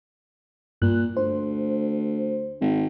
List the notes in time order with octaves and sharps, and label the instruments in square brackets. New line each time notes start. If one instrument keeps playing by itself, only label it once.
[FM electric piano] G2 F#6 [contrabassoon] A#2
[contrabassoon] D2 [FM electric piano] C5
[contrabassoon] G#1